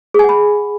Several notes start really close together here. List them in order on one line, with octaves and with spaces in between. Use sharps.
G#4 G#5 F#5 B5